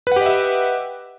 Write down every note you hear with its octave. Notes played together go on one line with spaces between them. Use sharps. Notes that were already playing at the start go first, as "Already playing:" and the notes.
G4 B4 D#5 E5 F#5